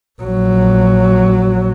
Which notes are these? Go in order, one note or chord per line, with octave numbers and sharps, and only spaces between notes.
A#1 F#3